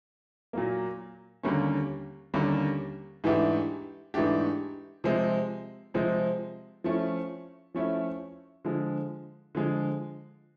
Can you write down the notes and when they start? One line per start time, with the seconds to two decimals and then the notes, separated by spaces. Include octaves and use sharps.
0.53 A#2 F#3 A#3
1.43 D#2 D3 G3 A#3 C#4
2.34 D#2 D3 G3 A#3 C#4
3.24 G#2 E3 A3 D4 G4
4.14 G#2 E3 A3 D4 G4
5.04 C3 F3 G#3 C4
5.94 C3 F3 G#3 C4
6.84 F3 A3 C#4 E4
7.74 F3 A3 C#4 E4
8.65 D3 F3 G#3
9.55 D3 F3 G#3